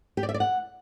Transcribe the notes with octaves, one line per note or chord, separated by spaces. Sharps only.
G4
D5
E5
D5
F#5